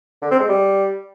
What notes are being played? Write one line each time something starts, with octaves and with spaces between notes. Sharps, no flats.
D3
C4
G#3
G3